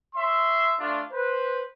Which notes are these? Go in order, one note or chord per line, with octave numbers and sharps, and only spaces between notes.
C#5 E5 C6
A3 D4 F4
B4 C5